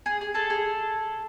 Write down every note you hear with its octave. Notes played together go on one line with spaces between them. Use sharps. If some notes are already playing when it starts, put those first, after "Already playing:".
G#4
G#4
G#4 A4 A5
G#4